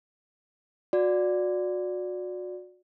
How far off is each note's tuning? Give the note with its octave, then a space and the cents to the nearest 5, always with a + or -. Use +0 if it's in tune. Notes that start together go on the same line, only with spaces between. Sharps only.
F#4 -30 D5 +0